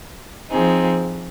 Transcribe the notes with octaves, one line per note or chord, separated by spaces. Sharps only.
F3 C4 D#4 G#4